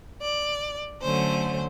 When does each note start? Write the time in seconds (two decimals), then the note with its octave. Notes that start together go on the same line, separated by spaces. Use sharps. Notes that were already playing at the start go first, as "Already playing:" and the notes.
0.22 D5
1.01 D3 F#3 A3 C#4 C5